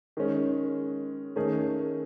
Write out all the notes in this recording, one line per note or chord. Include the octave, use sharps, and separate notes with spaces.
D#3 G#3 C#4
D#3 A3 C#4 G#4